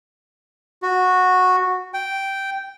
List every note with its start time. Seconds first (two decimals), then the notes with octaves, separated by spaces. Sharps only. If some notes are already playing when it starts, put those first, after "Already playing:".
0.82 F#4
1.94 G5